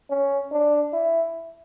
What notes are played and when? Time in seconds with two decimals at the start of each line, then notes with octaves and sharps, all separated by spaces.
0.10 C#4
0.52 D4
0.93 E4